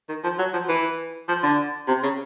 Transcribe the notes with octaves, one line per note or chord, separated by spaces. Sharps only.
D#3
F3
F#3
F3
E3
F3
D3
C3
C#3